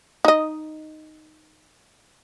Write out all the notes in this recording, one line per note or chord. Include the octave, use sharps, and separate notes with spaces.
D#4 D#5